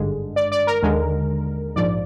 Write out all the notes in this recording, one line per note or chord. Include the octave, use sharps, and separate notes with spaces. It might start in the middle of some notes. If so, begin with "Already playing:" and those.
Already playing: G#1 G2 D3 G#3
D5
D5
A#4
D#2 D3 G#3
A#1 G#2 F3 D5